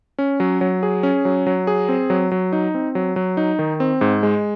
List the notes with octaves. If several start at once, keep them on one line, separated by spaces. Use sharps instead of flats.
C#4
F#3
F#3
G#4
C#4
F#3
F#3
G#4
C4
F#3
F#3
D#4
C4
F#3
F#3
D#4
D#3
C4
G#2
G#3